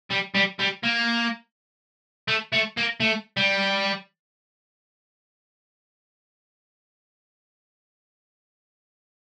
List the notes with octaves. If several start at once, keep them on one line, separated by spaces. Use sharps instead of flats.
G3
G3
G3
A#3
A3
A3
A#3
A3
G3